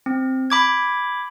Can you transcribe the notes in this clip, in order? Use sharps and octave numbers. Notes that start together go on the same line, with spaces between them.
C4
B5 D6 G#6